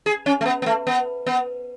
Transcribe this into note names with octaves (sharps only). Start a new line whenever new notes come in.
G#4
C#4
A3
B3
B3
A3
B3
B3